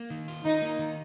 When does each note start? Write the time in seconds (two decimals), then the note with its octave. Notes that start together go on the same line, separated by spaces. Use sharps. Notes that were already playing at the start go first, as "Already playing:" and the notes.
Already playing: A#3
0.10 D#3
0.28 F4
0.45 D#3 D#4
0.62 A#3
0.79 D#3